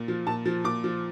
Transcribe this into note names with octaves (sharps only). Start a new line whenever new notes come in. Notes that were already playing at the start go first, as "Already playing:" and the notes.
Already playing: A#2
F3
A#2 A5
F3
A#2 D6
F3